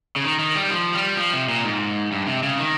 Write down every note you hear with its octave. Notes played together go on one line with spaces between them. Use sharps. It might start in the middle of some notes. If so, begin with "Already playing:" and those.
C#3
D#3
D#3
G3
F3
G3
F3
C3
A#2
G#2
G2
C3
C#3
D#3